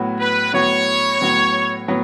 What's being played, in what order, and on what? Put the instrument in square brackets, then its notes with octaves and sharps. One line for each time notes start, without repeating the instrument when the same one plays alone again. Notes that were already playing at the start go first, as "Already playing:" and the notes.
Already playing: [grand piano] A2 F#3 B3 F#4
[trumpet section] B4
[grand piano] A2 F#3 B3 F#4 [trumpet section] C#5
[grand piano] A2 F#3 B3 F#4
A2 F#3 B3